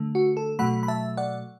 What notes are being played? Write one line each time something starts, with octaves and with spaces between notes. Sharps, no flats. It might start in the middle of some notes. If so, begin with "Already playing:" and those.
Already playing: D3 A3
F#4
A4
B2 F#3 A3 F#5 B5
B5
E5 A5
D5 F#5